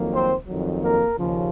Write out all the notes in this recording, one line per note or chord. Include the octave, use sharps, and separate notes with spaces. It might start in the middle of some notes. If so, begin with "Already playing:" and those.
Already playing: F2 D#3 F#3 A#3
C4 C5
F2 D#3 F#3
A#3 A#4
D#2 C#3 F3